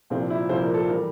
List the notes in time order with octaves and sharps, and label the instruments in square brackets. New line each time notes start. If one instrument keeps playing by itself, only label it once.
[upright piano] C2 A#2 F3 C4
E4
C2 A#2 F3 C5
A#4
A4
E3 G3 A#4